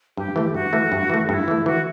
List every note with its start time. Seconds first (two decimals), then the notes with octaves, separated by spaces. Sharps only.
0.17 G2 G4
0.36 E3 A3
0.54 G2 F#4
0.73 E3 A3
0.92 G2
1.10 E3 A3
1.29 G2 E4 F#4
1.48 E3 A3
1.66 E3 F#4